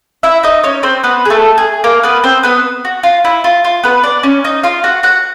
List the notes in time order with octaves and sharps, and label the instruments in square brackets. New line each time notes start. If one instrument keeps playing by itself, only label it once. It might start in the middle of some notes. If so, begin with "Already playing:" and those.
[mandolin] E4 E5
D#4 D#5
C#4 C#5
C4 C5
B3 B4
G#4
A3 A4
G#4
A#3 A#4
B3 B4
C4 C5
B3 B4
F#4
F4
E4
F4
F4
B3 B4
D4 D5
C#4 C#5
D#4 D#5
F4 F5
F#4 F#5
F#4 F#5